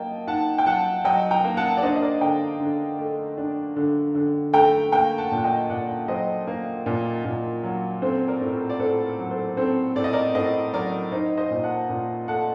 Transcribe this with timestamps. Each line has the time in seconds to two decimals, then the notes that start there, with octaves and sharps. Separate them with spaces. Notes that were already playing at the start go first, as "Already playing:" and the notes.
Already playing: F#3 A#3 D#5 G5 A5
0.27 D#4 F#5 A5
0.58 G5
0.66 F#3 F#5 A5
1.05 F#3 D#5 G5
1.31 G5 A#5
1.44 A#3
1.57 F#5 A5
1.77 D5
1.82 D4 C5 D#5
1.96 D#5
2.01 A#4 D5
2.21 D3 G5 A#5
2.60 D3
2.98 A3
3.37 D4
3.76 D3
4.15 D3
4.53 A3 G5 A#5
4.92 A#3 G5 A#5
5.18 F#5 A5
5.32 A#2
5.37 F#5
5.44 D#5 G5
5.70 A#2 D5 F#5
6.08 F#3 C5 D#5
6.47 A#3
6.86 A#2
7.25 A#2
7.63 F#3
8.02 C4 A4 C5
8.28 A#4 D5
8.41 A2
8.54 A#4
8.69 D5
8.79 A2 A4 C5
9.05 A#4
9.19 F#3
9.31 A4 C5
9.57 C4 A4 C5
9.95 A2 D5
10.04 D#5
10.13 A#4 D5
10.34 A2 C5 D#5
10.73 F#3 A#4 D5
11.12 D#4 C5 D#5
11.37 C5 D#5
11.51 A#2
11.64 F#5 A5
11.89 A#2
12.28 A3 F#5 A5